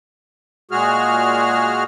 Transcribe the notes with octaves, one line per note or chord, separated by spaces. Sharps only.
A#2 G#3 F#4 G#4 F6